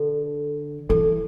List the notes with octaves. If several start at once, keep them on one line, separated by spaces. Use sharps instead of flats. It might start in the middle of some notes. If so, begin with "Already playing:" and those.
Already playing: D3 A4
E3 A4